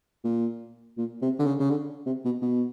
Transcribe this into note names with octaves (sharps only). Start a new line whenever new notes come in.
A#2
A#2
C3
D3
C#3
C#3
D3
C3
B2
B2